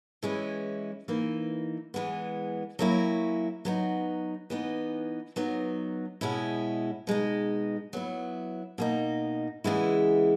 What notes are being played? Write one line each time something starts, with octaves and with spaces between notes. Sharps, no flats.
E3 G#3 C#4 E4
E3 A#3 D#4
E3 G#3 B3
F#3 A#3 C#4 E4
F#3 B3 D#4
E3 B3 D#4
F#3 B3 D#4
B2 G#3 C#4 E4
B2 G#3 D#4
F#3 B3 E4
B2 A#3 D#4
C#3 E3 G#3 B3 E4